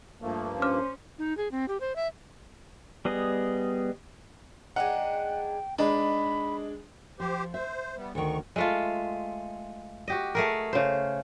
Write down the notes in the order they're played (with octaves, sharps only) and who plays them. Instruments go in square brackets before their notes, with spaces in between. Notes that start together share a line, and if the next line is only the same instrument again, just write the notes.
[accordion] G2 F3 A#3 [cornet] A3
[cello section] C#4 [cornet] C5 [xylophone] D6 F6
[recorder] D#4
G#4
C4
G4
C5
E5
[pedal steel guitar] G3 B3 G#4 D#5
[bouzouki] G#3 D4 D#4 [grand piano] F#5 [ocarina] G5
[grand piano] G#3 D4 [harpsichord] D#4 [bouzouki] B4 [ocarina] B5
[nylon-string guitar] F3 [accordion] G4 C5
[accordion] C5 [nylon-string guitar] E5
[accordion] G3 B3
[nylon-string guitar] D2 D#3 [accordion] C#6
[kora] G#3 A3 F4
F#4 G4 D#5
A3 G#4 A#4
C#3 C5